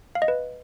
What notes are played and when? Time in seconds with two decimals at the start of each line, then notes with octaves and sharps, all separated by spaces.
0.15 F5
0.22 D#5
0.28 B4